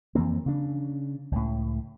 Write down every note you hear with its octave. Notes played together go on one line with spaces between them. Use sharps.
F2 E3 A#3 C4
C#3 D4
C#2 A2